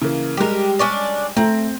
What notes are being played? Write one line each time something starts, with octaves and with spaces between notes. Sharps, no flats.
C#3 E3 A#3
G3 G#3 G4 A#4
C#4 D4 D5
A3 C4 A#5